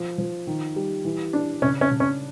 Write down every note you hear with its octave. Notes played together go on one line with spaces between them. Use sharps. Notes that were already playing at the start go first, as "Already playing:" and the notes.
Already playing: F3
F3
D#3
G3
E3
D4
C#3 C#4
C#4
C#3
C#4